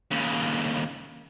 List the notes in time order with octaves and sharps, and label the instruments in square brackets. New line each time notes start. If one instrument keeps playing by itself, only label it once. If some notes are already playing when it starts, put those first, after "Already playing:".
[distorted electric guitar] D#2 C#3